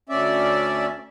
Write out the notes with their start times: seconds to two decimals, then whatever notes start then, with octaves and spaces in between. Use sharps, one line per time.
0.09 D2 C#4 D5 E5